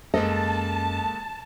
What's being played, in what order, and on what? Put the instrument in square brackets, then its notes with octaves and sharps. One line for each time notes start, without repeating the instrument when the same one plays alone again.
[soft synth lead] F#2 [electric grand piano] G#3 A#3 A4 [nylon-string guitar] D#5 [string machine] A5